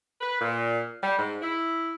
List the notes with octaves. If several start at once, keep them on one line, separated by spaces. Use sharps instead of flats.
B4
A#2
G3
G#2
E4